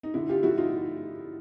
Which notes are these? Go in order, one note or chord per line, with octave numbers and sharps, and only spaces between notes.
D#4
D3 E4
F4 G4
F3 E4 F#4
D#4 F4